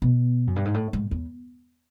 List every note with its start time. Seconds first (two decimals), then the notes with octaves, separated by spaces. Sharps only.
0.02 B2
0.47 F#2
0.56 G2
0.65 G#2
0.74 A2
0.93 G#2
1.11 E2